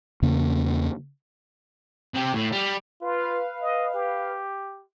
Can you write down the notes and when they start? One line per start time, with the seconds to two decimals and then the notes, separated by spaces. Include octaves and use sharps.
0.22 E2 C#3 A#3
2.14 C3 G4
2.34 A2
2.52 G3
3.01 F4 B4 F5
3.62 D#5
3.94 G4